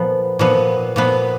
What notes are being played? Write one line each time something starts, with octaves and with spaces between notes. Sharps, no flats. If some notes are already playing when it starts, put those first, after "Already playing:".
Already playing: A#2 F3 B3
A#2 F3 B3
A#2 F3 B3